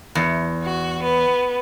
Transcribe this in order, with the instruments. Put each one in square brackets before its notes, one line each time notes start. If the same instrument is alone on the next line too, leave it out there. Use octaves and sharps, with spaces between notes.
[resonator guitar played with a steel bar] E2
[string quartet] F#4
B3